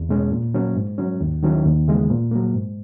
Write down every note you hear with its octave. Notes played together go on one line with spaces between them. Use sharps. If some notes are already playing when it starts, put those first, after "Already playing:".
Already playing: E2
B2 G#3 C#4
A#2
F#3 A#3 C#4
G#2
F#3 C#4
D#2
D#3 F#3 C#4 E4
D#2
C#3 E3 G#3 B3
A#2
F#3 A#3
G#2